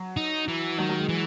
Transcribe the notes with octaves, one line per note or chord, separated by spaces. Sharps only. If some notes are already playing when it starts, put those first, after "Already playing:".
Already playing: F#3
D#4
E3
D#3 F#3
F#3
G#3
E3